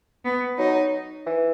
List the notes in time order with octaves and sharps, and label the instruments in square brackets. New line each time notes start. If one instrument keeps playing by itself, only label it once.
[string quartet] B3
[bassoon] F#3 [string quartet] D#4
[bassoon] E3